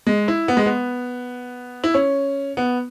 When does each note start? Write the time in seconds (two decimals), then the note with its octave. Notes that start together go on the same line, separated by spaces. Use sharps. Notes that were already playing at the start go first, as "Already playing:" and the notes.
0.07 G#3
0.28 E4
0.48 B3
0.57 G#3
0.66 B3
1.84 E4
1.94 C#4
2.57 B3